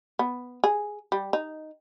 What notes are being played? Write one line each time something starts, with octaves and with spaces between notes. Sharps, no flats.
B3
G#4
G3
D#4